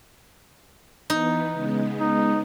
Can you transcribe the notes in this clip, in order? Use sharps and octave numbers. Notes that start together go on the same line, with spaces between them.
E3 B3 D#4
C#3 G#3 B3
D#4